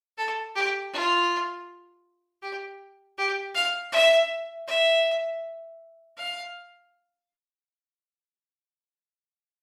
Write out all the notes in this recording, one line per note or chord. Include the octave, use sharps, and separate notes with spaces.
A4
G4
F4
G4
G4
F5
E5
E5
F5